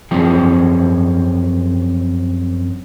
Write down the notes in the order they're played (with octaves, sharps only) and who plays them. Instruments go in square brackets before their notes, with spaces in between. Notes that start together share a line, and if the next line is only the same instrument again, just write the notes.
[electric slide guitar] F#2 F3 C4 G#4 G5